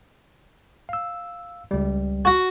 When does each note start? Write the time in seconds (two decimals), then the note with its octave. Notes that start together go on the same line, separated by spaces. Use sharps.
0.89 F5 E6
1.71 C#2 G3
2.25 F#4